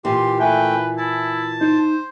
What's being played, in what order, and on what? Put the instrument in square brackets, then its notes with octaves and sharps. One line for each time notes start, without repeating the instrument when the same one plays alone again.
[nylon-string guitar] A#2 E3 [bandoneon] G4 [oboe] C6
[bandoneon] A3 G5 [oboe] B4 [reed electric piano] E5 G#5
[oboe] E4 [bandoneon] A5
[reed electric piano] D#4 [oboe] C5